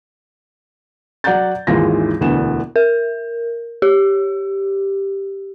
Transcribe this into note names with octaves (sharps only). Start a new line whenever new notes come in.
F#3 D5 F#5 A#5 G6 A6
G#1 D#2 E3 G#3 F4 A#6
E1 D2 E3 B3 E7
A#4
G4